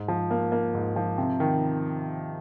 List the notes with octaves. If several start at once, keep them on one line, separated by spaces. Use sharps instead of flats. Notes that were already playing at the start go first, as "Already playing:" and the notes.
Already playing: G#2
F3
A#3
A#3
G#2
F3
C3
D#3